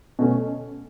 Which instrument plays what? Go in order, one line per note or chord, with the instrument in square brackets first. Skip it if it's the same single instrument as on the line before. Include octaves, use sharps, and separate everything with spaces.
[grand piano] B2 A3 C#4